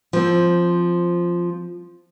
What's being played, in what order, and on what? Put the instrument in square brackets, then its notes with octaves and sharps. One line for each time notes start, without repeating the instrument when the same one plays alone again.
[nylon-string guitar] F3 C4